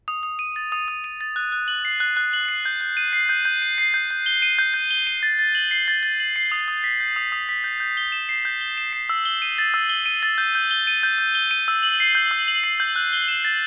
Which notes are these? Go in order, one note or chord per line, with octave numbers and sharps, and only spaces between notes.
D#6
D#6
D#7
A6
D#6
D#6
D#7
A6
F#6
F#6
F#7
C7
F#6
F#6
F#7
C7
G6
G6
D#7
C7
G6
G6
D#7
C7
G6
G6
G7
D#7
G6
G6
G7
D#7
A6
A6
F#7
C7
A6
A6
F#7
C7
D#6
D#6
B6
G6
D#6
D#6
B6
G6
G6
G7
E7
C7
G6
G7
E7
C7
E6
G7
D#7
A6
E6
G7
D#7
A6
G6
G6
G7
D#7
G6
G6
G7
D#7
E6
F#7
C7
G6
E6
F#7
C7
G6
F#6
G7
E7
A6